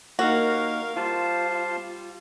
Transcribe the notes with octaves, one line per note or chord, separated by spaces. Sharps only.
A#3 D#4 F#4 A#4 F5
G3 F4 C5 F5 A5